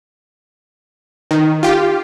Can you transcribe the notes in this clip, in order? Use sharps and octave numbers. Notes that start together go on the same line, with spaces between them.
D#3
F4 G4